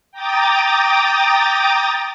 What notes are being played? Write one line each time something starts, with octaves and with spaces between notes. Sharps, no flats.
G5 A#5 D6 D#6 A6